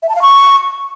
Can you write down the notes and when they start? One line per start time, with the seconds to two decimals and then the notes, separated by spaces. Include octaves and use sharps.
0.02 E5
0.09 A5
0.15 F5
0.22 C#6